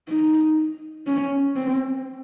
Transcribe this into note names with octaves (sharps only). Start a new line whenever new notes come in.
D#4
C#4
C4